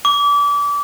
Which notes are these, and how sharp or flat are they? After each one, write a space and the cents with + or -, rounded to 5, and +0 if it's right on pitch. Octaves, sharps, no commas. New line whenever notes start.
D6 -30